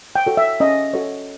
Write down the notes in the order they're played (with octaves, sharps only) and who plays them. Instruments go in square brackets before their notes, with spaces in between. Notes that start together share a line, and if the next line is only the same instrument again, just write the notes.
[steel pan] G5
F#4 A4 C#5
E5
C#4 D#5
F#4 A4 C#5